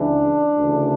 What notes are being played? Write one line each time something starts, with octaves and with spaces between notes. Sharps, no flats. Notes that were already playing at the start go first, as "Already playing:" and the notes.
Already playing: C#2 C#3 E3 D4
D2 C#3 E3